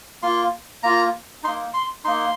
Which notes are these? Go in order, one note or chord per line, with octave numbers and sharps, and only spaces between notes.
A#3 F4 C6
A#3 F4 A#5
A#3 D#4 C6
C6
A#3 D#4 C6